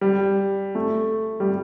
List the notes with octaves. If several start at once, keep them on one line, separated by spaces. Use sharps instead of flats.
G3
A3
G3